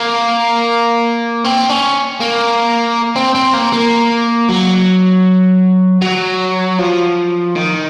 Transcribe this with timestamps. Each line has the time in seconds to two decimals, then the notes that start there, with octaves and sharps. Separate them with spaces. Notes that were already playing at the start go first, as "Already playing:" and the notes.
Already playing: A#3
1.44 C4
1.69 C#4
2.20 A#3
3.16 C4
3.35 C4
3.54 A#3
3.73 A#3
4.49 F#3
6.02 F#3
6.79 F3
7.56 D#3